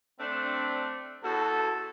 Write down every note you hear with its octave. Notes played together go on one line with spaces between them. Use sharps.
A3 C4 D4
E2 F#4 A4